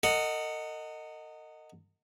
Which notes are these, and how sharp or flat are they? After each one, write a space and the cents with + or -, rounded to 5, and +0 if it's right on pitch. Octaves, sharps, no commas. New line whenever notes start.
A#4 -40 D#5 +0 F#5 +0